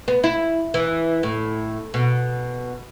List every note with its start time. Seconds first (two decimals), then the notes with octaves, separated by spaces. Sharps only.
0.08 B3
0.23 E4
0.74 E3
1.23 A2
1.94 B2